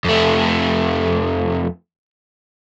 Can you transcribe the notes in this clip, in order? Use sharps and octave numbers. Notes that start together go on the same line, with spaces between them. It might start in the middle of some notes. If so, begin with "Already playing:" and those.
F2 A3